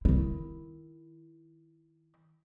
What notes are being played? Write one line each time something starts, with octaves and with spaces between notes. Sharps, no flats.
D#3 E4